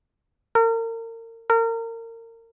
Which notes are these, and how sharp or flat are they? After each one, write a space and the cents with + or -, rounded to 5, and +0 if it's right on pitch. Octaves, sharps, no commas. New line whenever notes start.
A#4 -35
A#4 -30